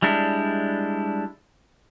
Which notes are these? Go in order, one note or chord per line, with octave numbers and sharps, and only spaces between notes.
G3 G#3 D4 E4